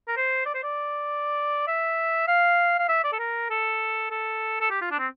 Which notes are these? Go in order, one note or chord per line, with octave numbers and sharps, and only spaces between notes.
A#4
C5
D5
C5
D5
E5
F5
F5
E5
D5
A4
A#4
A4
A4
A4
G4
F4
D4
C4